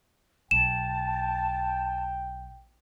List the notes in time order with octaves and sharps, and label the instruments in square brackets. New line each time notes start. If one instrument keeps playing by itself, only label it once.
[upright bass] B1 [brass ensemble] G5 [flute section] A5 [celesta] E7